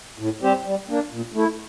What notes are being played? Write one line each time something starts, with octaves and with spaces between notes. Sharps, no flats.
A2
G3 C4 G4 C5
G3
A#3 D4
A#2
A3 E4